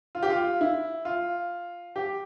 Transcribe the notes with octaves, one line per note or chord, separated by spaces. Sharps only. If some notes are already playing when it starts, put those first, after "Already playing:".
F4
G4
F4
E4
F4
G4